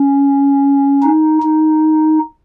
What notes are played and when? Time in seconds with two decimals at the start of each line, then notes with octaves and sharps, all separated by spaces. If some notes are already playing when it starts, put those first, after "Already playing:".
Already playing: C#4
1.03 D#4
1.43 D#4